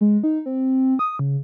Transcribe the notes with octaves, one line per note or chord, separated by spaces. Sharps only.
G#3
D#4
C4
D#6
C#3